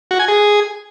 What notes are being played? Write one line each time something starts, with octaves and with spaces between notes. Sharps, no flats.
F#4
G#5
G#4